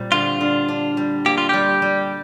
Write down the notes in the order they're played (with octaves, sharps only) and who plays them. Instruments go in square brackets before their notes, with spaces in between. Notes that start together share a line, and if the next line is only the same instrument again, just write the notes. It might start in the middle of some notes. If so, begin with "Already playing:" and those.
Already playing: [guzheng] A#2 G3 C4
[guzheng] D3 [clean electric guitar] F4
[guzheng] D3
D4
G3
[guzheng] A#3 [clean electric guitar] G4
[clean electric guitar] F4
[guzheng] G3 [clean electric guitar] G4
[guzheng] G3